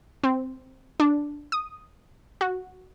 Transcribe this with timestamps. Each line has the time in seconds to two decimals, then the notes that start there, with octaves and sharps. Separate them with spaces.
0.23 C4
1.00 D4
1.52 D#6
2.41 F#4